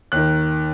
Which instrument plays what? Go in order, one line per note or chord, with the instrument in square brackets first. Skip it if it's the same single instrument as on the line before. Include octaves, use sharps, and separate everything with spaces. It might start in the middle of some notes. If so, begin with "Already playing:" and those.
[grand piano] D#2 D#3 F#6